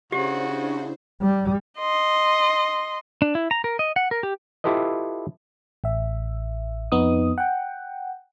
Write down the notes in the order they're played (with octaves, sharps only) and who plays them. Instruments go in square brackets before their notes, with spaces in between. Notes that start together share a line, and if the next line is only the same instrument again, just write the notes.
[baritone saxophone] C#3 [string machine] D4 E4 C5 [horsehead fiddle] F#4 [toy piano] G4
[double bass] G3
[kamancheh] D#5 C6
[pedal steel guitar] D4
E4
A#5
A#4
D#5
F#5
A#4
G4
[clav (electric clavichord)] E4 F4 G4 A4 B4 D#5
[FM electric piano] A1 E5
F2 B3 D#4 D#6
F#5 G5